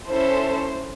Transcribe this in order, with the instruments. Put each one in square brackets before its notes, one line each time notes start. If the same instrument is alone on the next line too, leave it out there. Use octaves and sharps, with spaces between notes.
[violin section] C#4 E4 A4 C5